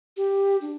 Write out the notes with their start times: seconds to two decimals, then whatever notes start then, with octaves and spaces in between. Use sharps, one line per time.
0.17 G4
0.61 D4